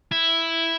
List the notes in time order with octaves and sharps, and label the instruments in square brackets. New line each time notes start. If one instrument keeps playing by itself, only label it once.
[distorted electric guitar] E4